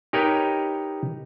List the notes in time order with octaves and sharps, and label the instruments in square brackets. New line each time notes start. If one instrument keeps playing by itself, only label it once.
[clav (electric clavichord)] D#4 G4 A#4 B4 C#5 D#5